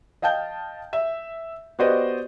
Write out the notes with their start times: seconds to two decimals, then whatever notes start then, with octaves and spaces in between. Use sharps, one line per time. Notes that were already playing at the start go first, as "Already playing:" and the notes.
0.22 D#5 F5 G5 A5 G6
0.93 E5
1.79 B3 F#4 G4 C5 D5 D#5